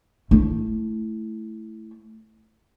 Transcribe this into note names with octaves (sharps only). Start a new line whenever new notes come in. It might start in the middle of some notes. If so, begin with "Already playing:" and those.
A3 E4